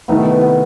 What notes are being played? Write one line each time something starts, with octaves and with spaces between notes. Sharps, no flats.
C2 C3 D#3 A3 B3 D#4
B3
B3